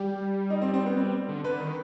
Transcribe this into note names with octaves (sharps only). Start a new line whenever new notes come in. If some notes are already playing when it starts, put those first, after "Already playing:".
Already playing: G3 G4
D#4
C4
C4
B3
G3 C4
D3
D3 B4
D#3